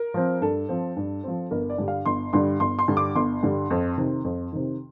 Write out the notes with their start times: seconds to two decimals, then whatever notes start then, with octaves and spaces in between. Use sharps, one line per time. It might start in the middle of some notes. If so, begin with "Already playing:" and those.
Already playing: A#4
0.14 F3 C4
0.41 G2 A4
0.69 F3 C4
0.97 G2
1.24 F3 C4
1.51 G1 A#4
1.70 D5
1.78 G2 D3 G3
1.88 F5
2.06 G1 C6
2.33 G2 D3 G3 C6
2.60 G1 C6
2.79 C6
2.88 G2 D3 G3
2.97 D6
3.15 G1 C6
3.43 G2 D3 G3
3.70 F2
3.98 C3 D#3
4.24 F2
4.52 C3 D#3